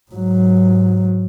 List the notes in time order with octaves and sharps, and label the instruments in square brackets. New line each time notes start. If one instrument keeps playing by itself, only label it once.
[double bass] G#2 F#3